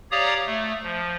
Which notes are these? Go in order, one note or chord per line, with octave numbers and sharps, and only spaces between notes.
G4 C#5 D5 F5 A#5 D#6
A3
F3